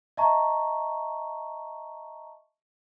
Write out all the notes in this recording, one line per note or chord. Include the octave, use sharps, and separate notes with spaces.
D#5 E5 A5 A#5 C#6